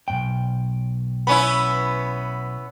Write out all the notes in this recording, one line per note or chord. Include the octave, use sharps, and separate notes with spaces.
B1 F#2 G5
B3 C#4 E4 B5